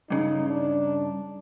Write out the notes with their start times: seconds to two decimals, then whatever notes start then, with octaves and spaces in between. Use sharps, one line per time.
0.10 G2 C#3 D#4
0.49 D4